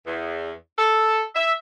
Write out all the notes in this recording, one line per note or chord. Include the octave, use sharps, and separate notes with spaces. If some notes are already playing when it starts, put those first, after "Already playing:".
E2
A4
E5